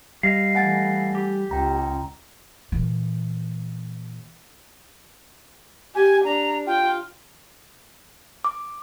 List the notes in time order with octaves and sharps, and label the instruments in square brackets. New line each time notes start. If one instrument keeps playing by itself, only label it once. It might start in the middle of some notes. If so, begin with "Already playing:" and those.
[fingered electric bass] G3 [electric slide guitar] D#5 F5
[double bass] E3 A3 [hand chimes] F#5 G#5 A6
[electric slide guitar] G4
[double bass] C#2 [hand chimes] G5 A#5
[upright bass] A#2 E3
[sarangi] G4 [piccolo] G#5
[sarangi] D4 [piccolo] A#5
[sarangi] F4 [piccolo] G5
[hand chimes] D6